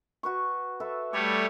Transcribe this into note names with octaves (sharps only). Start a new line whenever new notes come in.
F#4 B4 C#6
A4 B4 E5
G3 A3 C#5 D5 A5 B5